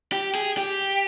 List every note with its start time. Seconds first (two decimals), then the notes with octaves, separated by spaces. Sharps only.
0.12 G4
0.35 G#4
0.58 G4